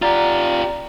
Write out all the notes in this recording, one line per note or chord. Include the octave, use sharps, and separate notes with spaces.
F4 G4 D5 A#5 A6